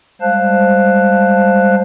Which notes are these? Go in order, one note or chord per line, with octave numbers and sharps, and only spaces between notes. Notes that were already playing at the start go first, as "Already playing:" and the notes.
G3 G#3 C5 F5 A5 F#6